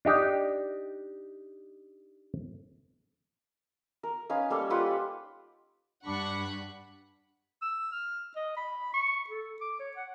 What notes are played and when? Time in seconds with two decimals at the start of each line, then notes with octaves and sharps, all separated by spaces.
0.05 D4 D#4 G4
4.03 A#4
4.30 C#4 D#4 B4 F5
4.50 G3 A#3 A4 C#6
4.70 F4 G4 B4 F#5
6.05 G2 D4 F#5 B5 C#6
7.62 E6
7.92 F6
8.36 D#5
8.57 B5
8.94 C#6
9.30 A4
9.61 D6
9.80 C#5
9.96 F#5